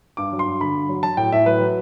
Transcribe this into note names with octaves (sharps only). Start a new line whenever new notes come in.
G2 D6
F#3
C6
G2
D3 B5
G2
F#3
F#3 A5
A2 G5
A2 E5
F#3 B4
F#3